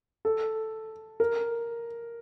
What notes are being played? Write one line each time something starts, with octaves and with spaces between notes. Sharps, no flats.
A4
A#4